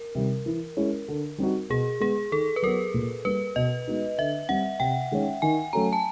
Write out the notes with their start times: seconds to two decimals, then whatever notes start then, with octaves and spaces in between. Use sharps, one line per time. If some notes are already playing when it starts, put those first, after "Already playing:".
Already playing: A#4
0.15 C3 D#3 G3
0.46 E3
0.77 G#3 C#4 E4
1.08 D3
1.38 G3 C4 D#4 F#4
1.70 B2 G#4
2.00 G#3 B3 G#4
2.32 D#3 A4
2.56 B4
2.62 F#3 B3 A#4
2.94 A#2
3.25 G3 A#3 B4
3.56 B2 D#5
3.87 G#3 B3 D#4 F#4
4.18 D3 E5
4.49 G3 C4 F#5
4.80 C3 G5
5.12 D#3 G#3 C#4
5.42 D#3 G#5
5.73 F#3 A3 C#4 F#4 A#5
5.93 A5